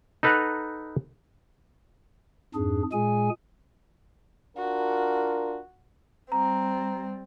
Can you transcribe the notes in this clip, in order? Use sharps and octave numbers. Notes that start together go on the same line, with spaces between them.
D#4 A4 B4 F#5 A#5
F2 G#2 D4 G#4
A#2 G#3 G#4 G#5
D4 F4 F#4 A#4
G3 C4 A#5